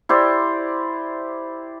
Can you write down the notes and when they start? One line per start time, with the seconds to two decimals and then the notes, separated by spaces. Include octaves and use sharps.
0.09 E4 G4 C5 D5